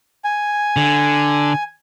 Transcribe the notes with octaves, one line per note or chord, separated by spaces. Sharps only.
G#5
D3